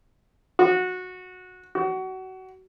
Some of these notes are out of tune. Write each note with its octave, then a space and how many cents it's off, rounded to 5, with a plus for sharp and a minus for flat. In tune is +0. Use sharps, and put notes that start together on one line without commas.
F#4 -15
F#4 +25